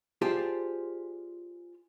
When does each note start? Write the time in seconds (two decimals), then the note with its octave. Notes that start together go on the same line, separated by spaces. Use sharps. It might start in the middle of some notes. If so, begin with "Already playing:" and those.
0.22 F4 G4 G#4 C5 D5 A5